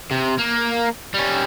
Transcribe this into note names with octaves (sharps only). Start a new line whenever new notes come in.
C3
A#3
G3 C#4